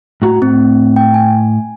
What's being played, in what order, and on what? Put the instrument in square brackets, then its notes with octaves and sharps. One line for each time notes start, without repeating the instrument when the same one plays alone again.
[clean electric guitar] A2 F#4 A#5
[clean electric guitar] A2 [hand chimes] C4
[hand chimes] G5
G#5